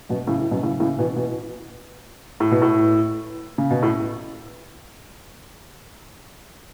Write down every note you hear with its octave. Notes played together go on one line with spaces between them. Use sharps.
F#2 B2
A2 C#3
A2
F#2 B2
A2 C#3
A2 C#3
B2 E3
B2 E3
A2
B2
A2
C#3
B2
A2